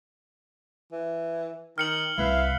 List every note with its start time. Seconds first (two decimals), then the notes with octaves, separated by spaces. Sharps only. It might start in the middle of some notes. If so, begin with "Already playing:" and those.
0.92 E3
1.78 D#3 F6 C#7 F#7
2.18 C2 E4 B4 E5 F5